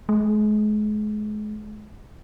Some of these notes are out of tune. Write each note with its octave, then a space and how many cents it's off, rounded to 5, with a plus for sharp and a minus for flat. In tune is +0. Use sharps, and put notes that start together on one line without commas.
G#3 +35